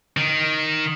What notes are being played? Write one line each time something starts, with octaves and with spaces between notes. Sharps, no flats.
D#3